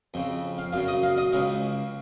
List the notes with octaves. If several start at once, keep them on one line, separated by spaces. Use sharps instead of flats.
F2 C#3
F5
F#2 C#3 F5
D#5
F5
D#5
C#2 C#3 F5